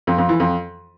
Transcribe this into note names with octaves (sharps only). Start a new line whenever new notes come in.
F2
F2
E3
F2